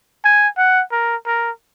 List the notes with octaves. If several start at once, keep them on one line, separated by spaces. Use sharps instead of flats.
G#5
F#5
A#4
A#4